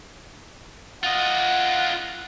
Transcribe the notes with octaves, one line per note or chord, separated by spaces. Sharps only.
F4 D#5 F#5